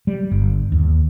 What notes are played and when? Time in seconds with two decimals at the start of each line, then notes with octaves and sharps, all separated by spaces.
0.07 G3
0.31 G1
0.72 D#2